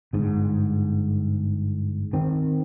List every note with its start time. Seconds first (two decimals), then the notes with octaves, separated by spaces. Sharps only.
0.13 G1 G#2
2.13 D#3 C4